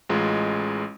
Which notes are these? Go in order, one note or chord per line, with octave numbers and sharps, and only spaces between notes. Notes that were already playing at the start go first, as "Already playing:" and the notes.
A1 G#3 F4